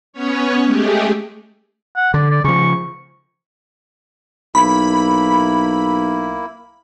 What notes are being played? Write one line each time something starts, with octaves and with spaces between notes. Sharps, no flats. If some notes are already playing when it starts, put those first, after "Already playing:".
B3 C#4 C#5
G#3 A3 G4 G#4
F#5
D3 D5
D5
C#3 F3 C#6
B1 A#3 E4 B5